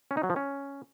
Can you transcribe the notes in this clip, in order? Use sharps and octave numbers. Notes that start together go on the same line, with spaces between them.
C#4
D#4
F#3
F3
C#4